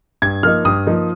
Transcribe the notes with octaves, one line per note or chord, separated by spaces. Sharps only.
G2 G#6
F3 A#3 D#4 F6
G2 D#6
F3 A#3 D#4